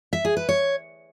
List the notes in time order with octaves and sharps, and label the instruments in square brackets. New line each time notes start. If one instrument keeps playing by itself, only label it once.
[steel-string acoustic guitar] E5
G#4
B4
C#5